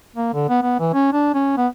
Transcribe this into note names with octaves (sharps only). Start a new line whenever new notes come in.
A#3
D3
B3
B3
E3
C#4
D4
C#4
B3